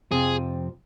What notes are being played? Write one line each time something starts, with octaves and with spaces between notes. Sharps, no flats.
F2 C3 F3 C4 F4 G#4